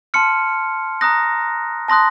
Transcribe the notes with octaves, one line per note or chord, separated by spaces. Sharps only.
A5 C6 F6 C#7
A#5 D#6 F#6 A#6
A5 C6 D#6 F#6 A#6